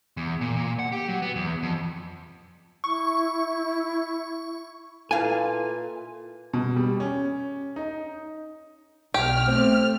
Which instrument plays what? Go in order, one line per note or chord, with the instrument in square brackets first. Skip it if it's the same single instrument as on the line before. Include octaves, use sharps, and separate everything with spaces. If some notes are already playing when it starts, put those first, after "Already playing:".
[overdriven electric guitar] E2
A#2
A#2
F#5
G4
F#3
B3
E2
F2
[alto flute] E4 [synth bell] C#6
[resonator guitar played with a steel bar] A#2 F5 [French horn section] E4 B4 [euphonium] A4 [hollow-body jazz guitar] G#5
[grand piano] B2
G3
C#4
D#4
[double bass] B1 [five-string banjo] G4 [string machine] F6
[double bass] A3 [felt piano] C4